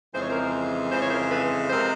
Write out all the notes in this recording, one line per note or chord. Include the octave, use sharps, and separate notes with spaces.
F2 C#3 E3 G#3 C5
C#5
A#4 C5
F2 C#3 E3 G#3 C5
C#5
A#4 C5
A4 B4
C3 F3 G#3 A#4 C5